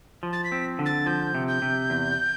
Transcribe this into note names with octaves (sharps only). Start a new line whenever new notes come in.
F3
A6
B6
C4
D3
A6
F3 G6
C3
G6
C3
E2